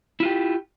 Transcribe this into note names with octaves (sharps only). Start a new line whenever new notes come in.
E4 F4 G4